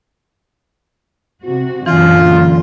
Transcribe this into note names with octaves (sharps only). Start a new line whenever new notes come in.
C3 F#4
F#2 A#2 D3 E3 F4 G#5